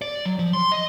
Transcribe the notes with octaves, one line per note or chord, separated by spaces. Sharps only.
D5
F#3
F3
C6
D#5